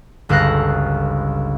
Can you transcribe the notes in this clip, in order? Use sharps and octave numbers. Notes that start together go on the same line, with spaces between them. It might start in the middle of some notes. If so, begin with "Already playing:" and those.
G1 C#2 A4 F5 F#6 A#6